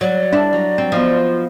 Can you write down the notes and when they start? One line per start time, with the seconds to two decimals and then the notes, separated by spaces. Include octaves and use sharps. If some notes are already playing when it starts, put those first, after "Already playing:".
0.01 F#3 D5
0.33 G3 D4 E4
0.53 F#3 A#5
0.78 C4
0.92 F3 B3 F4 D#5